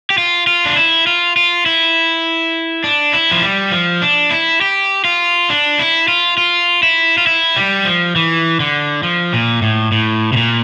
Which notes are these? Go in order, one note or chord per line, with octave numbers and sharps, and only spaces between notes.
G4
F4
F4
D4
E4
F4
F4
E4
D4
E4
F3
G3
F3
D4
E4
G4
F4
D4
E4
F4
F4
E4
F4
E4
G3
F3
E3
D3
F3
A#2
A2
A2
C3
A#2